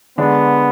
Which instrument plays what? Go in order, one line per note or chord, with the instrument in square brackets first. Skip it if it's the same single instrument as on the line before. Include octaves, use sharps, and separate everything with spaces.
[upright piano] D3 G#3 D4 [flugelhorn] B3